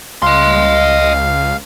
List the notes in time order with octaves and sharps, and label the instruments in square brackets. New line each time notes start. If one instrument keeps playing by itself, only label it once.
[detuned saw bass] C#2 [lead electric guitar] D#5 C6 [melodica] F5